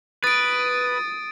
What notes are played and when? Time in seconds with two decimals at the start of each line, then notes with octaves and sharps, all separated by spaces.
0.24 B4 D#6 A6 D7